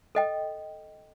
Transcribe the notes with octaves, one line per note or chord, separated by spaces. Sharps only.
A4 D#5 G5